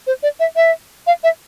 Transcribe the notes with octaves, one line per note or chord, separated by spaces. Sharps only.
C5
D5
E5
E5
F5
E5